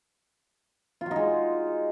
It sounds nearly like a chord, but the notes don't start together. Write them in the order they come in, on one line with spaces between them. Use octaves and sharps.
F4 F#3 D#4 G#3